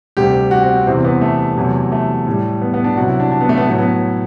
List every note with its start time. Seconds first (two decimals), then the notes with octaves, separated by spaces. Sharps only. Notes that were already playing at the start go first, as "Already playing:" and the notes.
0.17 D2 C3 G3 G4
0.51 F#4
0.63 C4
0.75 C4
0.87 E2 C3 E3 C4
1.05 B3
1.21 A3
1.57 E2 C3 F#3
1.92 A3
2.27 A2 G3
2.62 B3
2.74 B3
2.84 D4
2.97 C2 C3 F#3 F#4
3.08 E4
3.20 D4
3.32 D4
3.41 B3
3.49 A3
3.58 B3
3.67 A2 F#3 A3
3.78 B3